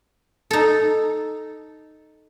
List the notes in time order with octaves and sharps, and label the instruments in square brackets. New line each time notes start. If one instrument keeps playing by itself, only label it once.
[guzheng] D#4 A4